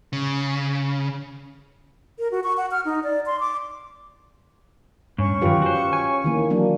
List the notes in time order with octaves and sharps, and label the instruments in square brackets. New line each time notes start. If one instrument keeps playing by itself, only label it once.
[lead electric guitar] C#3
[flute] A#4
F#4
C#6
F#5
F6
D#4
D5
C6
D6
[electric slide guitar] G2 [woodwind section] C#4 C#6
[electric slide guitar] F#2 D#3 [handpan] F4 G4 B4
[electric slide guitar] F#4 C5
G#5
[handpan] D#3 E3 A#3
F#3 A#3 D4